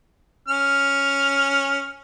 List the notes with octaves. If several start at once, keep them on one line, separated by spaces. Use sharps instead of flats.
C#4 F6